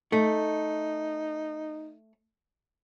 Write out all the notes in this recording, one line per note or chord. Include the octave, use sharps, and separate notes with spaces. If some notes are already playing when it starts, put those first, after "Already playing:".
A3 D#4